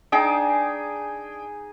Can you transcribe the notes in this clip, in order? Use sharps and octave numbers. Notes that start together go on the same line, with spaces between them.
D4 D#4 G#4 G5